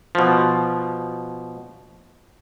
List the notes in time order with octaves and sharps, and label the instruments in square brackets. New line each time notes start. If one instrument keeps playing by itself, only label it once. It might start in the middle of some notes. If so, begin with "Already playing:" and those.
[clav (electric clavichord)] B2 F3